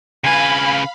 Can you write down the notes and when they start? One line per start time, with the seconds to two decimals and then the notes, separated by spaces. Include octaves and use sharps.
0.24 C#3 B4 F5 G#5 B5